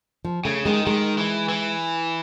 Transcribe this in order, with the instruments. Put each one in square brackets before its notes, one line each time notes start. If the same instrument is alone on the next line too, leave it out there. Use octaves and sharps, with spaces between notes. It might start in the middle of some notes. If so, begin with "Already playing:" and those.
[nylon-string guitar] F3
[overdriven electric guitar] C#3 [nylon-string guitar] A3
[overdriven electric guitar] D#3 [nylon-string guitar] G#3
[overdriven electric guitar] D#3 [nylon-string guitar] G#3
[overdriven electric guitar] E3
E3